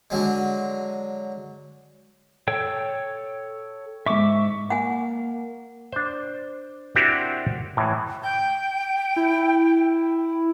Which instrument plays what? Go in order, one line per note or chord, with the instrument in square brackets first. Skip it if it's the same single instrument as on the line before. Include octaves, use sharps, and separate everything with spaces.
[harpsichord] D3 F#3 G#3
[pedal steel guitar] A4 C#5 G5
[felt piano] G#2 C#6 [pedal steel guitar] E5 D6
[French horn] A#3 [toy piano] F#5 G#5
[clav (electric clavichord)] D4 C5
C4 D4 E4 F#4 G4 A#4
A2 E3
[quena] G5 [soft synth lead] G6
[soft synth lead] E4